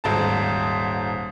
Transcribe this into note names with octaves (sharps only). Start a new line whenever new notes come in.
D#1 G#2 A5